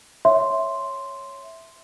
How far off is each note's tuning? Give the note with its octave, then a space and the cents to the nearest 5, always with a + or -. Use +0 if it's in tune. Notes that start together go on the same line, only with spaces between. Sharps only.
C#5 -5 E5 +0 C6 +0